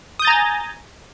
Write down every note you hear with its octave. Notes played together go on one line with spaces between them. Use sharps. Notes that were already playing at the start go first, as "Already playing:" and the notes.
G#5 A#5 D#6 G6 A6